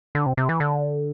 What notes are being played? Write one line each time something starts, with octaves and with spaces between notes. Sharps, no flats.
D3
C3
C3
E3
D3